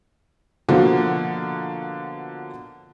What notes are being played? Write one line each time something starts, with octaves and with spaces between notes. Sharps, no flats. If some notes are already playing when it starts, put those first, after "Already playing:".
B2 D3 F3 A#3 F4 F#4